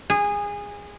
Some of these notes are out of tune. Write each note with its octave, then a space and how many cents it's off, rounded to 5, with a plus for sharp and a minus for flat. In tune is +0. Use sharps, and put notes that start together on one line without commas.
G#4 -20